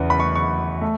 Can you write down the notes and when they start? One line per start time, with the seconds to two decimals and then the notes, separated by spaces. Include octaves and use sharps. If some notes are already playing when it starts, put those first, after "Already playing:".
Already playing: E2 C#3 E3
0.10 B5
0.20 C#6
0.35 C#6
0.81 A3